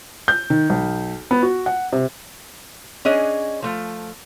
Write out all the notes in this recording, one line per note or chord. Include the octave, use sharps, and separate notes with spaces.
G6
D#3
B1
B3
F#4
F#5
C3
C#4 D4 G#4 D#5
F3 A3 F4